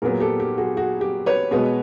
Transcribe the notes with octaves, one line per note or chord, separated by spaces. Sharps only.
A#2 F#3 B3 G#4 A#4
G4 A4
G4
F#4 G#4
F#4 G#4
G4
B4 C#5
B2 G#3 B3